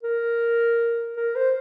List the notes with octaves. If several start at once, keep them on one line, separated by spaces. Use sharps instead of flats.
A#4
A#4
C5